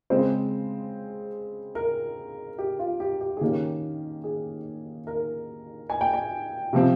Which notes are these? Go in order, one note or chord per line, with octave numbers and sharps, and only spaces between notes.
C#3 G#3 C4 C5
A#4
G4
F4
G4
G4
G#4
D#3 A#3 C#4 G4
G#4
A#4
G#5
G5
G#5
C3 F3 C4